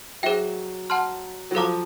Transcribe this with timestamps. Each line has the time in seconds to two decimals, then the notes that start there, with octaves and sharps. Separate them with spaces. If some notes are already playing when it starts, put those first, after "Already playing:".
0.23 F#3 G#4 C5 E5 G5
0.90 F#5 A5 C6 F6
1.51 F#3
1.55 F3 A4 C5 F5 A#5 D6